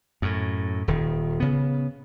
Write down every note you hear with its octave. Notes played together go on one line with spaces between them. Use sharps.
F#2 A2
D#1 D#3
C#3 B3